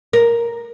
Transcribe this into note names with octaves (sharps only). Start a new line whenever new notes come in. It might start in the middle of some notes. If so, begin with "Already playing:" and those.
A#4